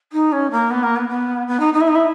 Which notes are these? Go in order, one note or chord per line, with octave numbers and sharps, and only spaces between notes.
D#4
C#4
A#3
B3
A#3
B3
B3
B3
D#4
D#4
E4
D#4
E4